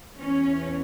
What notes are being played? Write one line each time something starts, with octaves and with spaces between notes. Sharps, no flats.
E2 E3 C#4